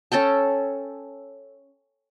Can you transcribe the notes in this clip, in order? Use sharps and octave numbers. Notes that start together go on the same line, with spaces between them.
C#4 A4 G5 A5